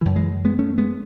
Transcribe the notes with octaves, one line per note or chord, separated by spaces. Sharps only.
F#2 C#3 E3
E3 G#3
G#3 B3
A3 C#4
G#3 B3